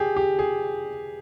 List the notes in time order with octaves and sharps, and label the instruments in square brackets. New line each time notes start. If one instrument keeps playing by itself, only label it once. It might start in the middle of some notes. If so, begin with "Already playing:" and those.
Already playing: [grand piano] G4 G#4
G4
G#4